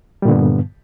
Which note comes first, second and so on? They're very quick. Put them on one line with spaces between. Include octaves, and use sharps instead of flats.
G3 A#2 D3 B3 G2